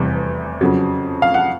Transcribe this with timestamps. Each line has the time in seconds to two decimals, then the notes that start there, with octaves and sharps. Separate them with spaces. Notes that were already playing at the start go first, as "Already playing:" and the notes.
Already playing: F1 E2 C3 E3 G3
0.61 F2 C#3 F#3
1.22 F5
1.34 F#5